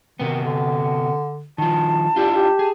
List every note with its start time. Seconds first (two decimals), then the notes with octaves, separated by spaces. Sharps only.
0.20 C3 D#3 B3
0.44 D3
1.58 D#3 F3 A5
2.16 D4 E4 F4 G4
2.35 G4
2.59 G#4